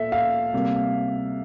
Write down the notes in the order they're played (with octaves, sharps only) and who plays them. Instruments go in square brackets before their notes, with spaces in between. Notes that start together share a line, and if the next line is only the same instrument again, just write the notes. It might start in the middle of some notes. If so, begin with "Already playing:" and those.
Already playing: [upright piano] A#2 [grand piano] A4 E5
[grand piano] F5
[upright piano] C3 G3 A#3